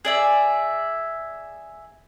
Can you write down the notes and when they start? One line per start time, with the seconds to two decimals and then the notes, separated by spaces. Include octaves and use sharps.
0.05 G#4 D5 E5